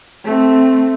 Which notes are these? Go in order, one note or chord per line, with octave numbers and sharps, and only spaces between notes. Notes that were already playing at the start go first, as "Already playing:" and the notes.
A3 C4